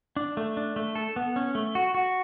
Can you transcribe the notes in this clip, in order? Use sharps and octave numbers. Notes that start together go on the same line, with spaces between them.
D4
A3
D4
A3
A4
B3
C#4
A3
F#4
F#4